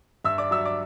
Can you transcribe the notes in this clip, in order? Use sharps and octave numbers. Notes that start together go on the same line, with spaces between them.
G2 E5 E6
D5 D6
F#3 E5 E6
D5 D6